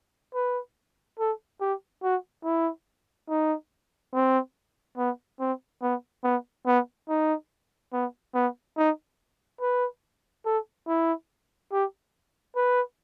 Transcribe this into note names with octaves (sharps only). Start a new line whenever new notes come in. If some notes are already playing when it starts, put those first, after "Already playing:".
B4
A4
G4
F#4
E4
D#4
C4
B3
C4
B3
B3
B3
D#4
B3
B3
D#4
B4
A4
E4
G4
B4